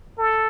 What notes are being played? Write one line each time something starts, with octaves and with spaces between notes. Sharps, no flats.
A4